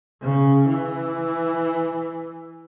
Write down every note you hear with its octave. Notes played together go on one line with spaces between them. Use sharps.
C#3
E3